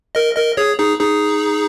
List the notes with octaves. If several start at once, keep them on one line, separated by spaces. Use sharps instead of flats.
A#4 D#5
A#4 D#5
G#4 C#5
D#4 G#4
D#4 G#4